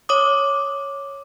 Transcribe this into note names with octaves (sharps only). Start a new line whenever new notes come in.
C#5 D6 D#6